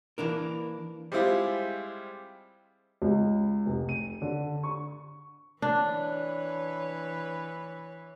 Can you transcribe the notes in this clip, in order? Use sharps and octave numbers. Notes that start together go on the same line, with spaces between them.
E3 A#3 D4 A#4
G3 G#3 C4 E4 F4 G4
C#2
F1
D#7
D3
C#6
E3 D4 B4 C#5